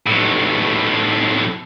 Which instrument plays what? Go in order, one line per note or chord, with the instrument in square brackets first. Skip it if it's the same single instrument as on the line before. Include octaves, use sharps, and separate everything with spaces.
[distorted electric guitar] B1 A2